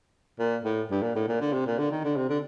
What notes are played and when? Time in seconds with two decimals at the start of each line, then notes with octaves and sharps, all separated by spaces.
0.39 A#2
0.65 A2
0.91 G2
1.02 A#2
1.15 A2
1.28 A#2
1.41 D3
1.53 C3
1.66 A#2
1.78 D3
1.91 D#3
2.04 D3
2.17 C3
2.29 D3